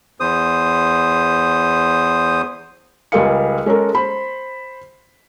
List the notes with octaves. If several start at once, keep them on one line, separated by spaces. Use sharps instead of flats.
E2 C5 D#6
C#2 G3 G#4 A#4 F5 C#7
G#3 C#4 A4 A#4
C5 B5